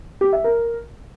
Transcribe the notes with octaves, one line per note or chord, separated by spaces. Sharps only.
G4
E5
A#4